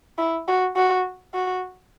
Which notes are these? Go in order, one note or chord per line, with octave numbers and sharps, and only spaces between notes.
E4
F#4
F#4
F#4